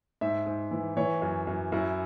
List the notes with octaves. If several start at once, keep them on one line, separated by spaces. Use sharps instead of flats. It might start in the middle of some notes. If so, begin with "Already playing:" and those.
G#2 E5
G#2
E3
E3 C#5
F#2
F#2
F#2 E4